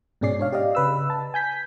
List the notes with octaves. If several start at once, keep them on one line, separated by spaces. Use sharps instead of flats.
G#2 B2 C#4 G#4 D5 C7
D4 C#5 F5
G4 D5 D#5 F5
C#3 B4 E6
A5
G#5 G6 B6